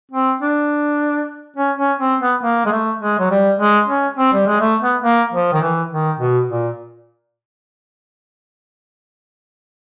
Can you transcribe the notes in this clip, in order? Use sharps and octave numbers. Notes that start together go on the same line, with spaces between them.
C4
D4
C#4
C#4
C4
B3
A#3
G#3
A3
G#3
F#3
G3
G#3
C#4
C4
G3
G#3
A3
B3
A#3
F3
D#3
E3
D#3
B2
A#2